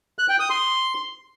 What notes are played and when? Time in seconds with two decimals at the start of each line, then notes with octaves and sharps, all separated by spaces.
0.19 F#6
0.29 G5
0.39 D#6
0.50 C6